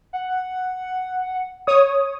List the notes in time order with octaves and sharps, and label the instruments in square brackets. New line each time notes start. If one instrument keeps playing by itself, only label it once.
[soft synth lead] F#5
[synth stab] C#5 D#6